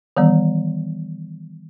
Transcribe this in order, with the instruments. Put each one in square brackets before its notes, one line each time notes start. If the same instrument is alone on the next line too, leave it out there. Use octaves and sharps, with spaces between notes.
[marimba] D#3 E3 G3 B3